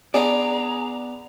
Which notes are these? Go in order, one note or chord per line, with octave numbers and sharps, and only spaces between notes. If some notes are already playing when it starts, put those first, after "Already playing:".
B3 D4 G#4 D5 A#5